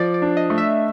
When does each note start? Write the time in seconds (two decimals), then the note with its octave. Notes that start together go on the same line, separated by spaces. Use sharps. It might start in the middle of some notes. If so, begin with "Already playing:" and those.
Already playing: F3 D5
0.14 D5
0.22 D4
0.37 D#5
0.50 A3
0.58 E5